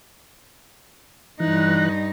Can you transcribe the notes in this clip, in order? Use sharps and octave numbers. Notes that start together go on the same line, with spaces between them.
G2 E3 D#4 F#6